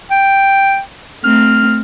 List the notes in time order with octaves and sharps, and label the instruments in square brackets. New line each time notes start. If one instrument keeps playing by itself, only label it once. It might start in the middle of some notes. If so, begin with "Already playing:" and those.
[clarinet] G5
[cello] A3 C4 [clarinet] F6